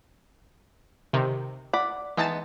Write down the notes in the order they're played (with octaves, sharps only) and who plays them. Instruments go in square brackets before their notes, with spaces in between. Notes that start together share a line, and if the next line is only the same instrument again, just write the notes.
[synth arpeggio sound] C3 D#3
[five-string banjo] D5 F#5 B5
[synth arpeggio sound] E3 A5 A6 [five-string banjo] G#3 B3 D#4